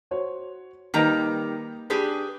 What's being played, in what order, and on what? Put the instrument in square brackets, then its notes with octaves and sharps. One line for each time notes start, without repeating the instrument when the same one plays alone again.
[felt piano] F#4 C5 C#5
[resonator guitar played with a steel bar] D#3 G3 A#5 [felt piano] A#3 D#4 B4
[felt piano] D4 [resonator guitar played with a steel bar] G4 G#4 B4